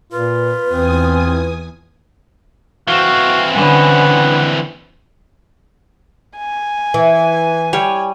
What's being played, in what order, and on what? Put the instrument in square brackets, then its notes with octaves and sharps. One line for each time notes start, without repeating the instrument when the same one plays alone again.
[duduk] A#2 [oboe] F4 [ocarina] B4
[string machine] E2 G#5 D#6 [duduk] C4
[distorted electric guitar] E3 C4 [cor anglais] F#4 [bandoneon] F5
[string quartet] D3 B3 [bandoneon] C#4 [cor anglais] F#5
[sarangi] G#5
[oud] E3
[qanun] G3 C#5